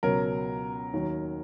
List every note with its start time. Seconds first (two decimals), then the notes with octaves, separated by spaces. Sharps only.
0.03 C#2 B2 F#3 A#4
0.93 D#2 D#3 F#3